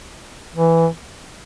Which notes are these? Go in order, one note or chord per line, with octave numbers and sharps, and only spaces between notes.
E3